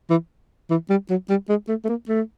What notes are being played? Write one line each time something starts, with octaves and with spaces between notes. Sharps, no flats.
E3
E3
G3
F#3
G3
G#3
A3
A3
A#3
A3